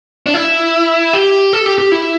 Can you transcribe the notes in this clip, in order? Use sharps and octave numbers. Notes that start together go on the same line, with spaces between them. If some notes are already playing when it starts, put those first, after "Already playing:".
D4
E4
G4
A4
G4
G4
E4